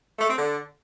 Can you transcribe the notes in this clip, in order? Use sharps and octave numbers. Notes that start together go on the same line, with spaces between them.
A3
C4
D3